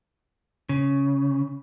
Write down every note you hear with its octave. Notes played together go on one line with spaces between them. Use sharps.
C#3